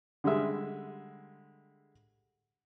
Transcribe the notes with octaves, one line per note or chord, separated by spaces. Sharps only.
D3 G3 G#3 E5